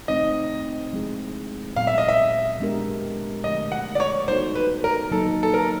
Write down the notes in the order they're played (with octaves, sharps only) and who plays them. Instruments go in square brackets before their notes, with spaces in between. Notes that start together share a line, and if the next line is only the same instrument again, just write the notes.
[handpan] A3 C4 D#4 [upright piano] D#5
[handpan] F3 G#3 C4 E4 G#4
[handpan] A#2 F#3 B3 [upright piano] F5
[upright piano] E5
D#5
E5
[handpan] G#3 B3 D4 G4 A#4
[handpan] D3 F3 A3 D4 [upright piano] D#5
[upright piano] F#5
D5
C#5
[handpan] G3 B3 D#4 F#4 A4 [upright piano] C5
[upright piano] B4
A#4
[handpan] F#3 A#3 D#4 [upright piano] A4
[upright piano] A4
A#4